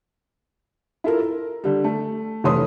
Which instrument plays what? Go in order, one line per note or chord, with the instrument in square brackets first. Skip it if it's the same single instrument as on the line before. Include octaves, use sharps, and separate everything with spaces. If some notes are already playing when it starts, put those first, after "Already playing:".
[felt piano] E4 F4 A4 A#4
A#4
D3 G3
A3
F1 E3 A3 C#5 C6 D#6